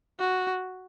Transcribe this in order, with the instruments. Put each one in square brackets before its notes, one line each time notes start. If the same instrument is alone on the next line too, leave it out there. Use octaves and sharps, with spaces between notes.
[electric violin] F#4